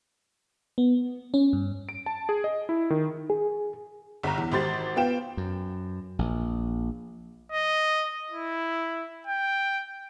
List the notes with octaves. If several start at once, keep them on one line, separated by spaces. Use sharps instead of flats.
B3
C#4
G2
D7
A5
G#4
D#5
E4
D#3
G#4
G1 A#5
E2
G#1 G4 C5 A6
B3 F4 G5 E7
F#2
A#1
D#5
E4
G5